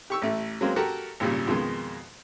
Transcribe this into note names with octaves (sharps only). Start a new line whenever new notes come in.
G4 C#6 E6
A1 A3
F#3 G#3 A#3 C4
F#4 G4 A4 A#4
G#1 A#2 C#3 G3
F2 B2 D#3 G#3